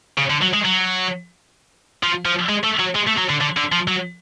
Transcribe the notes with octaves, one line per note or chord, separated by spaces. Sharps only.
C#3
D3
F#3
G#3
F#3
F3
F3
G#3
A3
F#3
G#3
A3
F#3
D3
D3
D3
F3
F#3